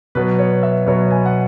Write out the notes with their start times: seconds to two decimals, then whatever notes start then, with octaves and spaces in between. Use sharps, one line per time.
0.15 B2 F#3 B3 B4
0.39 C#5
0.63 E5
0.87 B2 F#3 B3 C#5
1.11 G#5
1.26 F#5